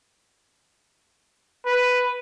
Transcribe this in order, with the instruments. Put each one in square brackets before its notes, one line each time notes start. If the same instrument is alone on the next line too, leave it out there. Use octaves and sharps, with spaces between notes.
[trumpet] B4